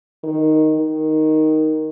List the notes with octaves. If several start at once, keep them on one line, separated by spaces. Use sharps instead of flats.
D#3
D#3